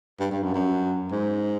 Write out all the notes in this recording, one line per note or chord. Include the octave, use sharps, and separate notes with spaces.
G2
G2
F#2
F#2
G#2